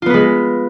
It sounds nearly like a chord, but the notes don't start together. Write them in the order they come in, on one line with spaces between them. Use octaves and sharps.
F4 B3 B4 G#3